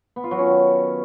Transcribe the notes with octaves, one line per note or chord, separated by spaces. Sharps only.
B3
F4
F#3
C#4
D#3